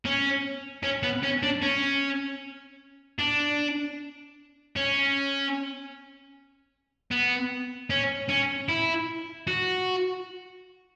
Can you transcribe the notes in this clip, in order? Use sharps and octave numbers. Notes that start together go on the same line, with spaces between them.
C#4
C#4
B3
C#4
D4
C#4
D4
C#4
B3
C#4
C#4
E4
F#4